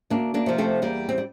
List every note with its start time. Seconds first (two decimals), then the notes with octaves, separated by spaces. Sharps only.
0.10 D2 A#3 D4
0.34 A#3 D4
0.46 C3 F3
0.58 A3 C4
0.82 E2 G3 A#3
1.09 C4
1.18 G3